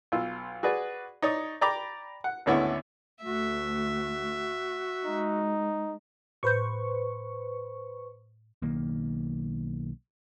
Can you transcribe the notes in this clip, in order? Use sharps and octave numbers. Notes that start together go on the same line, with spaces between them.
B1 F4 E6
F#4 G#4 B4 D5
D#4 C#5 D5 D#6
D5 G5 A#5 B5 D6
F#5
G#1 D2 D3 B3 C#4 E4
D2 A3 F#4 E5
G#3 D#4
A2 B4 C5 C#6 G6
B1 D#3 A#3